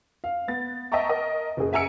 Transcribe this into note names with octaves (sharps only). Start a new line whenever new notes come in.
F5
B3 A6
D#5 E5 G5 A5 A#5 C#6
A#4 D#5
F#1 G#4
E5 G#5 A#5 E6 C#7 D7